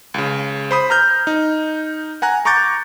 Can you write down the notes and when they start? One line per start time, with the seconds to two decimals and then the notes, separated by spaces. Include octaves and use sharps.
0.14 C#2 C#3
0.71 C5 B5 D#6
0.90 A#5 F6 G6
1.27 D#4
2.22 F#5 G#5 A#5 F#6
2.45 A#5 C#6 D6 G6 A6